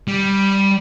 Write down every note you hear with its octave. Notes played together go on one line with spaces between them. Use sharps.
G3